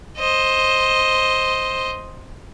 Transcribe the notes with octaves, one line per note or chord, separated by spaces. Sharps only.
C5 D#5